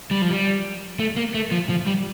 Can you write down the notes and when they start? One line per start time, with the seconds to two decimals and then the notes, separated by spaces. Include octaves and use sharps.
0.11 G3
0.22 F3
0.31 G3
0.99 A3
1.17 A#3
1.34 A3
1.52 F3
1.69 F3
1.87 G3